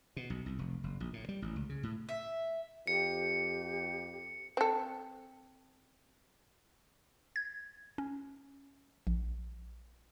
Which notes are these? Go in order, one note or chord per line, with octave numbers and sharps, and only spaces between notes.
B2
B1
C2
F1
F#1
A#1
A2
G3
A1
C#2
C#3
A2
E5
F2 G4 C#7
C4 A4
G#6
C#4
A#1